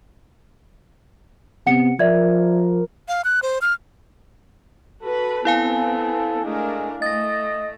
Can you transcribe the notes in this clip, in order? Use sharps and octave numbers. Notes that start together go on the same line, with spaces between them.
C3 B3 F#5 C#7
F3 A#4 D5 E5 G#6
F5
F#6
C5
F6
F#4 A4 B4
B3 C4 E4 F5 G#5
G#3 A3 D4 A#4
A3 D#5 A6 A#6